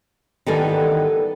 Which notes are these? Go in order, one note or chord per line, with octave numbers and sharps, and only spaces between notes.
D#3 E3 G3 B3 A4 G#5